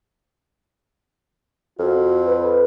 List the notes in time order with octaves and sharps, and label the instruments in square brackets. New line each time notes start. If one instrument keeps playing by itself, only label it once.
[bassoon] F2 [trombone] F#4
[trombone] B4